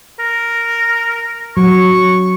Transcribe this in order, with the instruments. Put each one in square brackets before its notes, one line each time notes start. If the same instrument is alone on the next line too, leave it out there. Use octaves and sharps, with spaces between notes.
[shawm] A#4
[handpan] F#3 [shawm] C#6